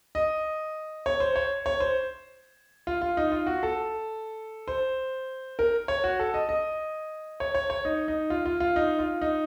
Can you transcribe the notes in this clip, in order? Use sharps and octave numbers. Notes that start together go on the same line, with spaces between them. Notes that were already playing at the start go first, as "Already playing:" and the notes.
D#5
C#5
C5
C#5
C#5
C5
F4
F4
D#4
F4
F#4
A4
C5
A#4
C#5
F#4
A4
D#5
D#5
C#5
C#5
C#5
D#4
D#4
F4
F4
F4
D#4
F4
D#4